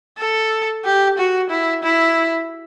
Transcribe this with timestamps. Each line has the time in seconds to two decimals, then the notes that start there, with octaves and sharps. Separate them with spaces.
0.18 A4
0.84 G4
1.18 F#4
1.50 E4
1.83 E4